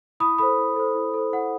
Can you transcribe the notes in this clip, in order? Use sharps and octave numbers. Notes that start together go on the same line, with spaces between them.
E4 B5 D#6
A4 C5 B5 D#6
E4
A4 C5
E4
A4 C5
E4 F#5